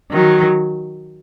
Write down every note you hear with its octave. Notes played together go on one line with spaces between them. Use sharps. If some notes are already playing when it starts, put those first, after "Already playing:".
D#3 F#3